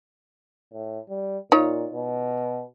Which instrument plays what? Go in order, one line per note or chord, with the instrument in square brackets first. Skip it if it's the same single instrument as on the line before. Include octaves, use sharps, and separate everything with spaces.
[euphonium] A2
G3
[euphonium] A#2 [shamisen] D#4 F4 C#5
[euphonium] B2